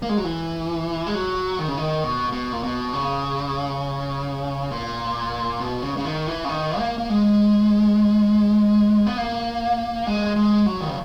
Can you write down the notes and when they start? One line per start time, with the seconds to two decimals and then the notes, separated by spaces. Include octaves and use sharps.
0.02 A#3
0.09 G#3
0.18 F#3
0.24 E3
1.07 G#3
1.15 F#3
1.59 D#3
1.68 C#3
1.78 D#3
2.04 B2
2.32 B2
2.52 A#2
2.63 B2
2.93 C#3
4.71 A#2
5.60 B2
5.82 C#3
5.97 C#3
6.05 D#3
6.27 E3
6.45 C#3
6.49 D#3
6.79 A#3
6.98 A#3
7.10 G#3
9.07 B3
9.17 A#3
10.07 G#3
10.36 G#3
10.66 F#3
10.80 D#3
10.88 C#3